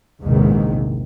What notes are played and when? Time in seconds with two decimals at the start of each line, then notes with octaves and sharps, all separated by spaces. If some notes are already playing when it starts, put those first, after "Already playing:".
0.22 A#1 E2 G#2 C3 D#3